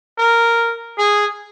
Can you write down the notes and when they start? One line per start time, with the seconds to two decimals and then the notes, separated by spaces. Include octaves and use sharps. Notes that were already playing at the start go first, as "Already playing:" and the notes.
0.18 A#4
0.98 G#4